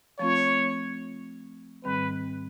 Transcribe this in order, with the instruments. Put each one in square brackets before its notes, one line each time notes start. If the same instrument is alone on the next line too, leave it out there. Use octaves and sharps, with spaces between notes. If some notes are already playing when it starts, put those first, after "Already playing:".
[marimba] F3 A3 C4 F4 [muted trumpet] C#5
[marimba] G#2 D#3 G3 C4 [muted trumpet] B4